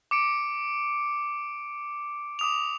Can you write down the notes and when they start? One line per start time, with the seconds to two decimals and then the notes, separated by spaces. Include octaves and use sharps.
0.11 D6 C#7 D7
2.39 D6 D#6 F7